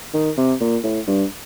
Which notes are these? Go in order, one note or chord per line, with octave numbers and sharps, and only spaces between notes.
D#3
C3
A#2
A2
G2